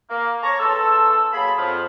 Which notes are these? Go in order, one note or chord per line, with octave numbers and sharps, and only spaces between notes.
A#3
C#5 A5 A#5 C#6
E2 A4 A5 C6 E6
F#3 A#3 G#4 A5 B5
F2 F3